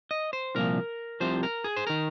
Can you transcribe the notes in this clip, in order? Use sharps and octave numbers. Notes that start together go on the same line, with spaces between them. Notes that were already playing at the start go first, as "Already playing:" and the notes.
D#5
C5
C2 A#2 F3 A#4
C2 C3 F3 C5
A#4
G#4
C5
D#3 A#4